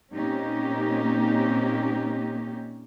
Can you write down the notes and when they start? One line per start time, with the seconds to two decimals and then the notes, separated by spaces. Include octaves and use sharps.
0.14 A#2 A#3 C4 C#4 D#4 G4